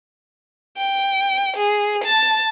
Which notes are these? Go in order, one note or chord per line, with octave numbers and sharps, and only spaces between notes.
G5
G#4
A5